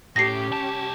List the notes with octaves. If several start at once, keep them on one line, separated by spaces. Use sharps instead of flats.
A2 C#4 G4 A#6 C7
C2 A5